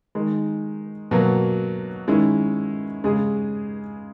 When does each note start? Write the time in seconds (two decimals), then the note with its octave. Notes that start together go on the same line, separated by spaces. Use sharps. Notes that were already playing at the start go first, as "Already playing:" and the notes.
0.15 D#3 G#3 D#4
1.11 B2 F#3 A#3
2.08 D#3 G#3 C#4 E4
3.04 C#3 G#3 C#4 G#4